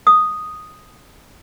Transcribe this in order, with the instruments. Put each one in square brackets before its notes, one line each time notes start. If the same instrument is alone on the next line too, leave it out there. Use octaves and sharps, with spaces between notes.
[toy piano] D#6